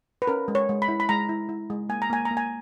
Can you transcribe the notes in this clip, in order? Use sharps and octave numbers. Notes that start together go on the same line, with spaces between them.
B4
C#4 A#4
G#3
C#5
G#3
B5
E4
B5
G#3 A#5
E4
E4
G#3
A#3 G#5
A#5
A#3 G#5
A#5
A#3
G#5